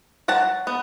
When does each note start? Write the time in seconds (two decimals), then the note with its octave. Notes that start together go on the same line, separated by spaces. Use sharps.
0.28 F#3 F#5 A5
0.67 B3